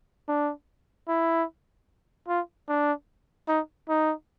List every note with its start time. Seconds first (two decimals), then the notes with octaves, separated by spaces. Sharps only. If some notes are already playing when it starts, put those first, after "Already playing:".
0.28 D4
1.08 E4
2.28 F4
2.69 D4
3.48 D#4
3.89 D#4